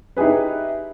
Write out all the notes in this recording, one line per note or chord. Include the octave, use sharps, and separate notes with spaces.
D#4 E4 G4 G#4 B4